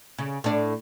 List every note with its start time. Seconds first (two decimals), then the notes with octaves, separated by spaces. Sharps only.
0.18 C#3
0.44 A2 D4